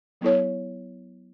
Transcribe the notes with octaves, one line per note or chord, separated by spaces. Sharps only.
F#3 B3 E4 A4 C#5